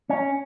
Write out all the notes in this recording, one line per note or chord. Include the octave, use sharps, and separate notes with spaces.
C#4